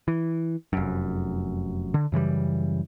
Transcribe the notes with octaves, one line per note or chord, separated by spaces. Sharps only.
E3
F1 F#2
D3
F#2 C#3 E3 G3